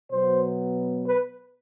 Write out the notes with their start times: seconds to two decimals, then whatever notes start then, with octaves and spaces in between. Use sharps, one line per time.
0.11 B2 F#3 B3 C5
1.08 B4